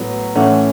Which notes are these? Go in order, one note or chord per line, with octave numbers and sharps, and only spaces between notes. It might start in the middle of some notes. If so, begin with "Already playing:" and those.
Already playing: A2 F#3 B3
A2 E3 A3 C#4 F#5